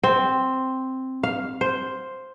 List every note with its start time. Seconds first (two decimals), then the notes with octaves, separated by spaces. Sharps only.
0.03 C4
1.23 F5
1.61 C5